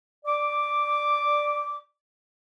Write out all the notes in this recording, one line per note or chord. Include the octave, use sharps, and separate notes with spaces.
D5 D6